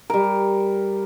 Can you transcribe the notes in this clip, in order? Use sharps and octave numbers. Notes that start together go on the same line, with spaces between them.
G3 A#4